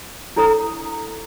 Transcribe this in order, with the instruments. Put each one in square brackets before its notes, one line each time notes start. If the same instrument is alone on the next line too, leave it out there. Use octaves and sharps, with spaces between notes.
[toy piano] D4 E4 A4 C#5 A#5 D#6